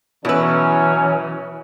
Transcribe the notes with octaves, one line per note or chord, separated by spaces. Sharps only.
B2 E3 F#3 C#4 E4 B4 E6